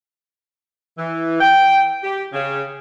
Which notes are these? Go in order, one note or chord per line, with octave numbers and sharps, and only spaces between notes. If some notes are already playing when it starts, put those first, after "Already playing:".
E3
G5
G4
C#3